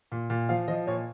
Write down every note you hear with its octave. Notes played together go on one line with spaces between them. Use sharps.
A#2
A#2
F3 F5
F3 D#5
A#2 C#5